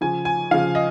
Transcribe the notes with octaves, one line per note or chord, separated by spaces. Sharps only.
C#3 F3 G#5
G#5
C#3 F3 F5
D#5